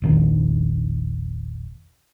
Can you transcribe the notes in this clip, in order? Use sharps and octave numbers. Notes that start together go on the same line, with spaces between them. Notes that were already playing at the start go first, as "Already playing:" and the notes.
E1 A#1 D#3